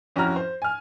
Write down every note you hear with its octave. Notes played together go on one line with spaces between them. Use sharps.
F2 C#4 E4 F#4 A#5 F6
C5
G#5 F6